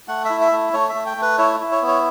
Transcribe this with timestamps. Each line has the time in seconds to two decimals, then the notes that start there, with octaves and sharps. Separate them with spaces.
0.08 A3 F#5
0.25 E4 E5
0.41 E5
0.52 A3
0.73 A3 C#5
0.89 E5
0.95 A3
1.06 G5
1.17 A3 B4
1.38 E4 C#5
1.60 E4
1.72 C#5
1.82 B3
1.88 C#5